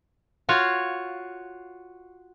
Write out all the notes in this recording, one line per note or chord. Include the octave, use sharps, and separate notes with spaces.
F4 F#4 C#5 F5